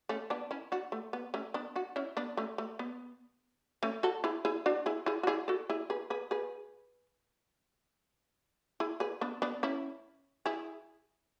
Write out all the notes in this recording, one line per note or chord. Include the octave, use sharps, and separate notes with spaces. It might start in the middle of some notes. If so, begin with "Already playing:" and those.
A3 C#4
B3 D4
C#4 E4
D4 F#4
A3
B3
A3 C#4
B3 D4
D4 F#4
C#4 E4
B3 D4
A3 C#4
A3
B3
A3 C#4
F#4 A4
E4 G#4
E4 G#4
D4 F#4
E4 G#4
E4 G#4
F#4
E4 G#4
F#4 A4
E4 G#4
G#4 B4
G#4 B4
G#4 B4
E4 G#4
G#4 B4
B3 D4
B3 D4
C#4 E4
E4 G#4